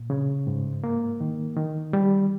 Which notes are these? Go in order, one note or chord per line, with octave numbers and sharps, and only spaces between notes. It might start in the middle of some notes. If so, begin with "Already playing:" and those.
Already playing: A#2
C#3
G#2
A#3
D#3
D#3
G3